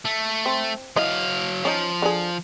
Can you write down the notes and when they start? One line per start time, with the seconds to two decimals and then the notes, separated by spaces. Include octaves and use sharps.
0.05 A3
0.46 C4
0.96 E3 F#3 D#5 F5
1.65 F3 C#4 D#4
2.02 D3 G#4